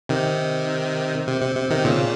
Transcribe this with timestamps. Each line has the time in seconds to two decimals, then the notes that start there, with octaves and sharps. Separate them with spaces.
0.09 C3 D#3
1.27 C3
1.41 C3
1.56 C3
1.70 C3 D#3
1.85 A#2 C#3